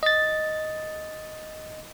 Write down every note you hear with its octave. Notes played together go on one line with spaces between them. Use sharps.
D#5 A6